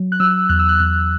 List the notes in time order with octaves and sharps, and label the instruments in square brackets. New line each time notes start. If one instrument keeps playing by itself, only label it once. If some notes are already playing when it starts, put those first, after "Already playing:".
Already playing: [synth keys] F#3
F#6
F#3 E6
E2 F#6
E6
F#6
E2 F#6